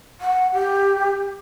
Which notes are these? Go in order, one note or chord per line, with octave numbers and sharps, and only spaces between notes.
F#5
G4